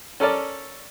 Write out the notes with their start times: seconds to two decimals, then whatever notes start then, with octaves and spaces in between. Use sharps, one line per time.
0.20 C#4 A4 A#4 D5